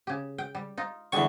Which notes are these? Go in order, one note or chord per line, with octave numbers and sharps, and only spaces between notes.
C#3 G4
G5
G3
D#4 F4
E2 D3 G3 G#3 C#6